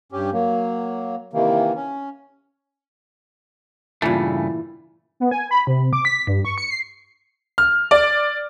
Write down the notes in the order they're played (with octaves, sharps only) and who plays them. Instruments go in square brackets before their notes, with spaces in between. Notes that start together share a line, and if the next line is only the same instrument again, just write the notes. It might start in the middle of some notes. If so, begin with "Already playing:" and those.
[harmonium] G2 C#4 G4
F#3 A#3
C3 D#3 E3 A#3
C#4
[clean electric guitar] G2 C#3 A3 [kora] A#2 E3
[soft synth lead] B3
G#5
B5
C3
D6
B6
G2
C#6
C#7
C7
[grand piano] F6
D5